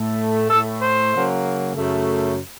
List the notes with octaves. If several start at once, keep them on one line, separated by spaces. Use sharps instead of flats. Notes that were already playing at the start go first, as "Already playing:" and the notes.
Already playing: A2 A3
A2 A3 A4
C5
C#3 F#3 A#3
F#2 C#3 A3